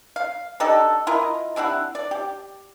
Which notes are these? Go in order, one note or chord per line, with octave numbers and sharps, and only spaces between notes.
F5
D4 D#4 G4 A4
E4 F4 A#4 D#5
C3 D4 E4 F#5
D5
G4